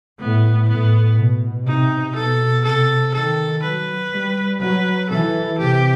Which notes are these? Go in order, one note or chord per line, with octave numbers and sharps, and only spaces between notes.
A2 B3
A2 B3
B2
C3 D#4
B2 A4
C3 A4
D#3 A4
F#3 B4
G3
F#3 B4
E3 A4
C3 G4